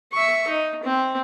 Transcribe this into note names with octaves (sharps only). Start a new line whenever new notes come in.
E5 C#6
D#4
C4